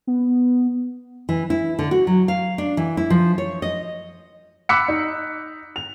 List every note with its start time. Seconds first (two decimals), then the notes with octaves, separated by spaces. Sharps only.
0.07 B3
1.29 E3
1.50 E4
1.79 D3
1.91 F#4
2.07 F#3
2.28 F5
2.58 D4
2.77 E3
2.97 E4
3.10 F3
3.38 C#5
3.62 D#5
4.69 B5 D6 E6 F#6 B6 C#7
4.88 D#4
5.76 F7